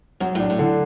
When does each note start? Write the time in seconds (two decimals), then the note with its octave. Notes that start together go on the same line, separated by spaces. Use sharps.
0.20 F#2 F#3
0.35 A2 D4
0.50 A2
0.59 D3